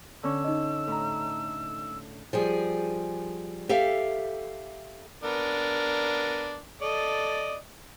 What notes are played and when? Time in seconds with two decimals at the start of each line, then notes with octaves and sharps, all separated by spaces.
0.23 D3 C#4 E6
0.44 D#4 D#5
0.87 A2 A#5
2.33 F3 G3 G#4
3.69 G4 A4 E5 F5
5.23 B3 D4 A#4
6.81 A4 D5 D#5